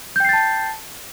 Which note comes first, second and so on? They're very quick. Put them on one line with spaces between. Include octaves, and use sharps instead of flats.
G6 G5 C7 A6 A5